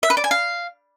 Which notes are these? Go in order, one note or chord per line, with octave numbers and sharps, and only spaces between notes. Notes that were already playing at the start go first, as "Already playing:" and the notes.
E5
B4
D5
G#5
F5